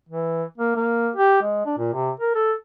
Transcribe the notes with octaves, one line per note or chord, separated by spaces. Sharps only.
E3
A#3
A#3
G4
G#3
D4
A#2
C3
A#4
A4